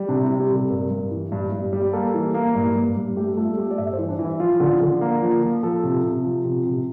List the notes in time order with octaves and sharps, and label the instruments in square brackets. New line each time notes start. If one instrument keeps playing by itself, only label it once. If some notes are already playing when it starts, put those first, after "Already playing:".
Already playing: [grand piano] G3
C3 D4
E4
G3
G4
C3 A4
G2 A#4
G2
E3
G2
G2
G3
A#3 A4
E3
A#3
G2
G2
G2
A3 G4
A3 F4
A3 G4
D5
G2 E5
C5
E3
D4
E3
E4
F3 F4
D3
D3
A#3
F3
F3
F3 A4
C3
C3
F3
C3
C3